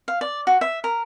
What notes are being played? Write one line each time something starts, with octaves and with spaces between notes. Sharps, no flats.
F5
D5
F#4
E5
A#4